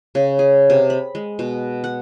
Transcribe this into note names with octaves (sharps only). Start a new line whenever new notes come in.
C#3
G#4
C3
B5
G#3
B2
F#5